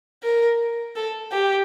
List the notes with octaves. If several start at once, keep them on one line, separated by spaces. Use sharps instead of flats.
A#4
A4
G4